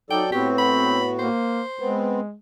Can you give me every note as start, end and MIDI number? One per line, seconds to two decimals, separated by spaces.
0.10 0.30 54
0.10 0.23 63
0.10 0.30 69
0.10 0.30 74
0.10 0.28 79
0.32 1.28 45
0.32 1.28 59
0.32 1.00 60
0.32 1.28 66
0.32 0.49 67
0.58 1.08 83
1.19 1.62 58
1.19 1.96 72
1.80 2.35 56
1.80 2.20 59
1.80 2.20 60